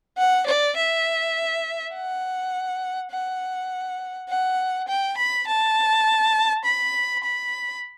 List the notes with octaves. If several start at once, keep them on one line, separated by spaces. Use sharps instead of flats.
F#5
D5
E5
F#5
F#5
F#5
G5
B5
A5
B5
B5